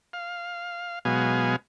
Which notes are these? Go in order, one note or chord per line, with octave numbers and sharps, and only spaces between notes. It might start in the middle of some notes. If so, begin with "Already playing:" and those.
F5
B2 F#3 G#3 B3 F5 G#5